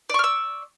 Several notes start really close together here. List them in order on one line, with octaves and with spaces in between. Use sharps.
D5 C#6 F6 E6